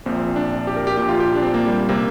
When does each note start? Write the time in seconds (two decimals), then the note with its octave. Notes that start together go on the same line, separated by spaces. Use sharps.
0.06 A#1 A#2 C4
0.36 D4
0.67 G4
0.76 A#4
0.87 G4
0.97 A#1 A#2 G4
1.09 F4
1.20 G4
1.35 D4
1.43 C4
1.54 A#3
1.66 G3
1.89 C3 A#3